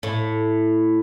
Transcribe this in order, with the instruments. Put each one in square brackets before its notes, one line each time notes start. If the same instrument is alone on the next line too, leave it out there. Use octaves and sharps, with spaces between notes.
[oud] A2